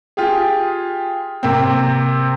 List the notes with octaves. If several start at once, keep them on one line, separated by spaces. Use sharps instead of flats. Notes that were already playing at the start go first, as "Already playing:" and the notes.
F4 G4 G#4
C3 A#3 C4